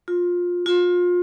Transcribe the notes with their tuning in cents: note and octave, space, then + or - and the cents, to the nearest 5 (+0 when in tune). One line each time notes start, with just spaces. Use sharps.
F4 +20
F4 +30